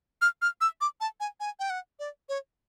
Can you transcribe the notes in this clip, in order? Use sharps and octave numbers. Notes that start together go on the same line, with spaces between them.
F6
F6
E6
D6
A5
G#5
G#5
G5
F#5
D5
C#5